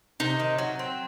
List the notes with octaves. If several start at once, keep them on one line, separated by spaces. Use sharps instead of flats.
C3 D#4
D#3
F#3
C4